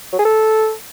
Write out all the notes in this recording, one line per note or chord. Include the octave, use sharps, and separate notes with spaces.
F#3
G#4
A4